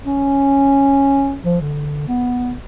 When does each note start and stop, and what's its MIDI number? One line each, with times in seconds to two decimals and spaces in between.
0.05 1.38 61
1.44 1.57 53
1.61 2.07 50
2.08 2.52 59